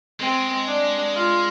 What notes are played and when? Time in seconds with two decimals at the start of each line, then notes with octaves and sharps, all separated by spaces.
0.20 G#3 C4
0.67 D4
1.14 F4